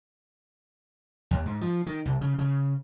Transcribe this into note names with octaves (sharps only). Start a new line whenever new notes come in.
D#2
G#2
F3
D#3
C2
C#3
C#3